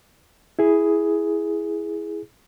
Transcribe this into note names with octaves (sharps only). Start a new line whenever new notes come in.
E4 G#4